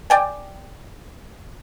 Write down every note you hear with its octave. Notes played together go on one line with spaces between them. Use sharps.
D5 G5 G#5